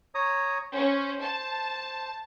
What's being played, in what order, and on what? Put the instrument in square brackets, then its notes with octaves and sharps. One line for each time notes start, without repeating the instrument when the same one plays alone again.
[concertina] C#5 A#5 D#6
[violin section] C#4 [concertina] C5
[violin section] A5